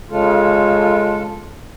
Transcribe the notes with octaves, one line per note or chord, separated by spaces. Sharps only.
C#3 G#3 F4 A4